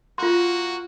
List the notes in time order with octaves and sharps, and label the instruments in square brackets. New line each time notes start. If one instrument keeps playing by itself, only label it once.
[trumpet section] A#3 F#4 [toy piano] F4 C6